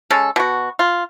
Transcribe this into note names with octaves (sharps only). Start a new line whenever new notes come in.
G#3 C#4 A4
B2 F#4
F4